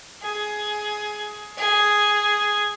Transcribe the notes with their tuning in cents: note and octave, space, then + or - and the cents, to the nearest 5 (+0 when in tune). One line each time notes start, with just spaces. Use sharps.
G#4 +15
G#4 +0